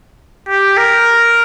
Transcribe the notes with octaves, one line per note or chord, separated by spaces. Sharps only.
G4
A#4